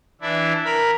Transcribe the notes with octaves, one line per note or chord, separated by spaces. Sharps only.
E3 D4 E4
A#4 B5